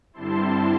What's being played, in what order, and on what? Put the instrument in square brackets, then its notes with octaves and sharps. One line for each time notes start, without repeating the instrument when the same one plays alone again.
[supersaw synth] G2 D3 G3 C4 E4 A5 C6